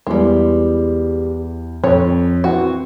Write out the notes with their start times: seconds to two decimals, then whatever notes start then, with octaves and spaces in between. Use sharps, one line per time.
0.07 E2 E3 G3 G#3
1.84 F2 C#5
2.44 E3 C4 F#4